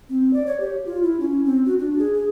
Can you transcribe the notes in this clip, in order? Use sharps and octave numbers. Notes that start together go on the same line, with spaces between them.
C4
D5
C#5
G4
F4
E4
C#4
C4
F#4
D4
G#4
G#4